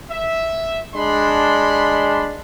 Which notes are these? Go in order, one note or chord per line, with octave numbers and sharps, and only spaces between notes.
E5
G#3 D4 B5 C6